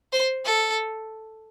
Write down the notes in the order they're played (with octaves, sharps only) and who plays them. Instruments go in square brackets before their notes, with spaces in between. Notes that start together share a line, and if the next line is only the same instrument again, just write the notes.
[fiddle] C5
A4